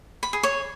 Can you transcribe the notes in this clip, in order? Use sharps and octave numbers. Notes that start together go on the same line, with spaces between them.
B5
G#4
C#5